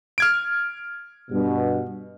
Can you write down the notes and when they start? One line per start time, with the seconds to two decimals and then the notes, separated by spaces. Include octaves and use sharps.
0.18 F6 G#6 D7
1.30 G2 B2